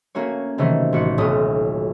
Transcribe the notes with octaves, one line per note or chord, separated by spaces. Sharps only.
A3 A#3 C#4 F#4 C#5
C3 D#3 E3 F#3 A3
A1 F#4 C#7
D#1 B1 B2 A3 D#6